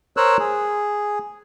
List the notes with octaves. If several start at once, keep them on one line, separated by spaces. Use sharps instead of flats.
A#4 C5 C#5 E6 F#6
G#4